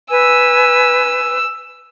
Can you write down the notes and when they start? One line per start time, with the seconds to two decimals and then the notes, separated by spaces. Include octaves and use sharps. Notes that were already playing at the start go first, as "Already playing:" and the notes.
0.11 B4 G#5 E6